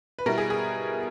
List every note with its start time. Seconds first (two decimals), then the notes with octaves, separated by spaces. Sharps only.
0.19 B4
0.26 B2 G3 B3 E4 A#4
0.38 G#4
0.50 G#4